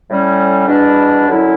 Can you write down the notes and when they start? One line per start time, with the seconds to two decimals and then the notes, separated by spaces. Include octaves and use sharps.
0.09 A2 G3 C#4
0.68 E2 B2 G3 D4
1.27 F#2 D3 F#3 C#4 E4